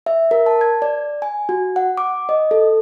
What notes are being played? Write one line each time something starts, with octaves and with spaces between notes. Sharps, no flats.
E5
A#4
A5
G#6
D5
G#5
F#4
F#5
D6
D#5
A4